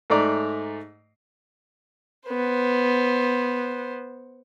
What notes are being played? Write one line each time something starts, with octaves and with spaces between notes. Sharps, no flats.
G#2 A3 D5 A#5
B3 C5